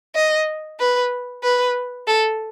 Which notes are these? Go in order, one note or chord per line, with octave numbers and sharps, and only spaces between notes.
D#5
B4
B4
A4